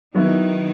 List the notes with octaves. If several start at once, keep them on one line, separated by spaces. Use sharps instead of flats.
D#3 F#3 B3 D#4 E4